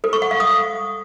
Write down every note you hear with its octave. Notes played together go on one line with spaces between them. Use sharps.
A4
C#6
F#5
F5
D#6